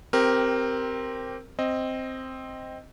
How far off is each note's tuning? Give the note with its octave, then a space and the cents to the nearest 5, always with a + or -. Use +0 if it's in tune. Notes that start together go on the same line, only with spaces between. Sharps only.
C4 +0 G4 -15 A#4 +0
C4 +0 D#5 +0